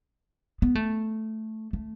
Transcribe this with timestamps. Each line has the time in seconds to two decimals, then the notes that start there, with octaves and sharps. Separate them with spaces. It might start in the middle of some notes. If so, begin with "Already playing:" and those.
0.62 B3
0.75 A3
1.73 A3